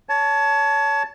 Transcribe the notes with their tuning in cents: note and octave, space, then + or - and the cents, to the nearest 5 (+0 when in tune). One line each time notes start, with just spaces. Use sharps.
C#5 +20 A5 -5